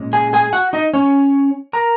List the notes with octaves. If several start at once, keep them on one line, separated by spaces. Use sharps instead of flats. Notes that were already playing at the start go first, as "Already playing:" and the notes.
Already playing: A#2 G#3 C#4
G#4 G#5
G#4 G#5
F#4 F#5
D#4 D#5
C#4 C#5
A#4 A#5